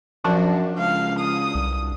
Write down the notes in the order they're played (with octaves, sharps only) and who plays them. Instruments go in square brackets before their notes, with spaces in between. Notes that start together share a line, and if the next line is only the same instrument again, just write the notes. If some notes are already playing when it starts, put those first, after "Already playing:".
[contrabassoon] F#2 [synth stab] F3 D4 F#4
[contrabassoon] C#2 [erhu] F5
[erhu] D#6
[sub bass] C2